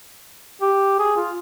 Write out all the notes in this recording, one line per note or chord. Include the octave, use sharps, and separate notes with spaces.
G4
G#4
F4